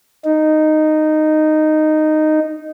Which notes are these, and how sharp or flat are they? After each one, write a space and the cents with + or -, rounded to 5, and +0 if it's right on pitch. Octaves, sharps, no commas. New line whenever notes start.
D#4 -10